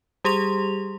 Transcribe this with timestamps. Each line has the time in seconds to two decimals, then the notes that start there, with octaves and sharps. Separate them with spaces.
0.24 G3 G4 G#4 C6 F7